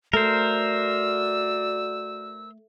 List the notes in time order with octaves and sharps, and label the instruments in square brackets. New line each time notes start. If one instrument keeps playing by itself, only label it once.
[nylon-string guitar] A3 [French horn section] F#4 D5 [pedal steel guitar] A#4 C5 [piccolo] E6